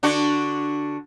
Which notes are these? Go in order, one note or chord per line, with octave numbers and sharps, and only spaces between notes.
D3 D4 F#4